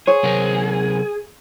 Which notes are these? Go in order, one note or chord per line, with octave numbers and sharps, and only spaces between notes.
G#4 C5 C#5
C3 F#3 A#4